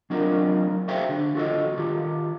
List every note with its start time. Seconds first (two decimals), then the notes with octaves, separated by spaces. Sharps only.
0.10 F#3 C4 D4 D#4 F4 A#4
0.88 F#4 G#4 C5 E5 F5 G5
1.09 D3
1.35 F4 F#4 A4 B4 D#5
1.78 D#3 F4 G4